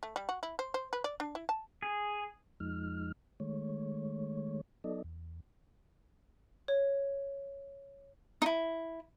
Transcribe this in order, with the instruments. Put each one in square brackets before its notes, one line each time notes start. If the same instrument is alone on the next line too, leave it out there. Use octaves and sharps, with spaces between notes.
[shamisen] A3
G3
F#4
E4
C5
C5
B4
D5
D4
E4
A5
[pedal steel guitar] G#4
[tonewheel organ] F2 F3 G#3 D#4 F6
D#3 G#3 A3 C#5
F#3 B3 D#4 A4 D5 D#5
E2
[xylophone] C#5
[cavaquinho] D#4 E4